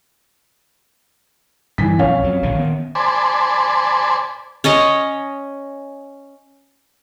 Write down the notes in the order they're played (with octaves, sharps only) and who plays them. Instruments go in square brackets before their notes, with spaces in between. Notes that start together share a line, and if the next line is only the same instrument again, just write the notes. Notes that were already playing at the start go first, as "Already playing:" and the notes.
[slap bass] G2 [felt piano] E3 B6
[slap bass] B1 F2 [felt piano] C#4 C#5 F5
[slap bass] F2 F#3
A#1 A#2 D3
D#3 B3
[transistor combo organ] C5 D5 G#5 A5 B5
[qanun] C#4 C#5 D#5